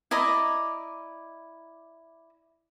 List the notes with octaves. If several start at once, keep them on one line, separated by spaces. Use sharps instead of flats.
E4 D5 D#5 A#5